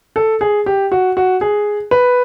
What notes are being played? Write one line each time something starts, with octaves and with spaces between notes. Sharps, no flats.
A4
G#4
G4
F#4
F#4
G#4
B4